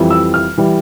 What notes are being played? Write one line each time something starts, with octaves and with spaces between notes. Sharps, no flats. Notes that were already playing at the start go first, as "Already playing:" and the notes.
Already playing: F2 E3 G3
E6
F6
E3 G3